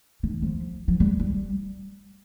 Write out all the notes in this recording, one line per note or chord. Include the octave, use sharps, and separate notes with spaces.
D#3
F3
F3
G3
G3